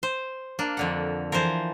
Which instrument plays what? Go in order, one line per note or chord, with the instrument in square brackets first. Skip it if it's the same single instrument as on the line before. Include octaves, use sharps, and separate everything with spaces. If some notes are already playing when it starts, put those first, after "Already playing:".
[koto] C5
[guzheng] A#3 [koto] D4
[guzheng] F2 D3 F#5
[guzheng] E3 F3 [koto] A#4 C5